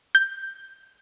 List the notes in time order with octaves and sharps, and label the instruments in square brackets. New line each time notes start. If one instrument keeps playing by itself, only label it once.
[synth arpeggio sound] G6